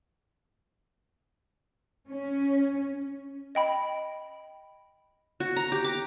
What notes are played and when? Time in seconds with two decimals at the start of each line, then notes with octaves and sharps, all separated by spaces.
2.09 C#4
3.55 D#5 G5 B5
5.40 F#4
5.56 A#5
5.72 G4
5.84 D6